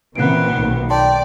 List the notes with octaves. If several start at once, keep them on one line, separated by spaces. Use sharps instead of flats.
A#2 C#3 E3 B3 C4 F#6 C7 D7
B1 D#3
D5 G5 A5 C6